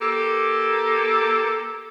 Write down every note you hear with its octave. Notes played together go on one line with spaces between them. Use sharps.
A#3 G4 A4